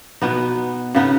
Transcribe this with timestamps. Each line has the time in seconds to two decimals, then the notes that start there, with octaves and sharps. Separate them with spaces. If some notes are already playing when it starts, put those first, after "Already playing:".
0.22 B2 B3 D#4
0.95 C#3 B3 D#4